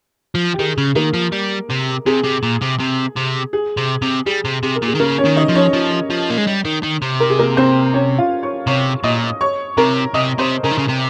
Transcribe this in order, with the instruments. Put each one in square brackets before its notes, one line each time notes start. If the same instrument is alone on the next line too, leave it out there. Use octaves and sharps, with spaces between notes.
[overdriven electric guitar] F3
[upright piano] G4
[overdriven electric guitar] D#3 [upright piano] G#4
[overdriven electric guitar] C#3
[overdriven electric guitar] D#3 [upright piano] A#3 A#4
[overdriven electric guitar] F3
G3
C3
[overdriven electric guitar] C3 [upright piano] G#4
[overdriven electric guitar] C3
A#2
C3
C3
C3
[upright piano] G#4
[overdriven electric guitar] C3
C3
[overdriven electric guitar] G3 [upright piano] G#4
[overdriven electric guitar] C3
[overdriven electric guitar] C3 [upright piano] G#4
[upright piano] A#4
[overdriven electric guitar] A#2
[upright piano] G#4
[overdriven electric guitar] D#3
[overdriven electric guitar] C#3 [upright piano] A#3 A#4
[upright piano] C#4 C#5
[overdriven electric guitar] D#3
[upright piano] D#4 D#5
[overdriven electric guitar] F3
[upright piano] C#4 C#5
[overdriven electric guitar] F3
F3
A#3
G#3
G3
D#3
D#3
C3
[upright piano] A#4
G#4
A#3 A#4
C4 C5
C#4 C#5
F4 F5
C#5 C#6
[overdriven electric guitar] C3 [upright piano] C#5 C#6
[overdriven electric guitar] A#2 [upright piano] D#5 D#6
[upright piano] C#5 C#6
[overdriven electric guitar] C3 [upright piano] A#4 A#5
[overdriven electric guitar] C3 [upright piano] D#5 D#6
[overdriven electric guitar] C3 [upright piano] C5 C6
[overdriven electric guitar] C#3 [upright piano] A#4 A#5
[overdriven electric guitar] D#3
C#3
C3